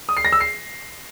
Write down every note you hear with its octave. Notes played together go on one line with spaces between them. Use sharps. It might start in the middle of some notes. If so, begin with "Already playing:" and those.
D#6
C7
A#6
E6
C7